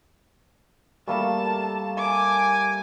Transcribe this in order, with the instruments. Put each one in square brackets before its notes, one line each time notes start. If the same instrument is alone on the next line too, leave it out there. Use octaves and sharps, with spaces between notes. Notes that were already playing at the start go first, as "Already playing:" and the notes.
[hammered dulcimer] G3 [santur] A3 A#3 A4 [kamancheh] A5
[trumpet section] G#5 [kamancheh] D6